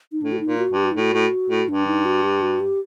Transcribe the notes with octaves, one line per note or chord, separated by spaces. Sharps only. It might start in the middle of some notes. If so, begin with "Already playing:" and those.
D#4
A2 D4
F#4
D#4
A#2
F#4
G2
G4
F#4
D#4
A2 F#4
A2
A2
G2 D4
D#4
F#4
G4
F#4
G4